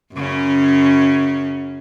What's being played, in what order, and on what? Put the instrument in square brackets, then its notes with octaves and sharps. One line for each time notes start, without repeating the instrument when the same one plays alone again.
[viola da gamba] F#2 C#3 C#4